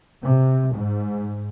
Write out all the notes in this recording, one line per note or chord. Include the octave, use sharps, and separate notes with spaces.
C3
G#2